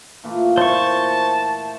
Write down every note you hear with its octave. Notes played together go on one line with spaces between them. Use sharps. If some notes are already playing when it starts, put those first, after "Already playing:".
A#2 E3 A3
C5 A5 C#6